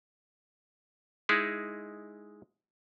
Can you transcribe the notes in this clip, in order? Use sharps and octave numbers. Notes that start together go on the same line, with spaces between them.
G#3 D#4 E4 G#4